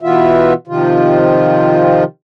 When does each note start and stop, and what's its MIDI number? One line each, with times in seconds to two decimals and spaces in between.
0.01 0.53 47
0.01 0.53 52
0.01 0.53 59
0.01 0.53 65
0.01 0.53 76
0.67 2.04 48
0.67 2.04 51
0.67 2.04 53
0.67 2.04 65